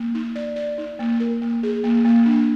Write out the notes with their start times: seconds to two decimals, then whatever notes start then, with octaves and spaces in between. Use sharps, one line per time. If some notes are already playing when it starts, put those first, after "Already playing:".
Already playing: A#3
0.15 D#4
0.36 D5
0.56 D5
0.78 D#4
0.99 A#3
1.20 A#4
1.42 A#3
1.63 G#4
1.84 A#3
2.05 A#3
2.26 D4